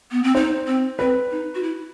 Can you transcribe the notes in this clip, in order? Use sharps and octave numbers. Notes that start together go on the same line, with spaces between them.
B3
C4
D#4 C5
C4
C4 B4
D#4
F#4
E4